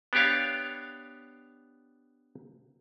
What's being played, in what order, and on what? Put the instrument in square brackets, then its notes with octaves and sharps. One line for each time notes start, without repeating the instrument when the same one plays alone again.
[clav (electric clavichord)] B3 D4 G4 C#5 F5